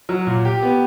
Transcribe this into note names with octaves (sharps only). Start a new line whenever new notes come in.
F#3
A#2
G4
B3